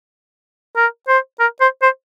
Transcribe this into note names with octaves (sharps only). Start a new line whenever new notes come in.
A#4
C5
A#4
C5
C5